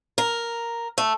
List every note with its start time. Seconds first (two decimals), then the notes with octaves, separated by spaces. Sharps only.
0.18 A#4
0.98 A3